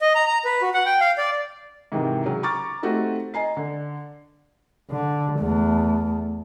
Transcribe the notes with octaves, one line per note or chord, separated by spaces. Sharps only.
D#5
A#5
A#5
B4
F#4
F#5
G5
F5
D5
G#2 C3 D#3 E3
C#3 F#3
A#5 C#6 D6 F6 A6
A3 C4 D#4 F#4 G4 A4
D#5 G#5 A#5 C7
D3
D3
E2 A3